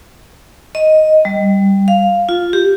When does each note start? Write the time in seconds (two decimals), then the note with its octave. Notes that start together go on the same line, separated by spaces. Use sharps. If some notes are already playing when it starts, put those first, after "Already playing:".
0.75 D#5
1.25 G3
1.88 F5
2.29 F4
2.53 G4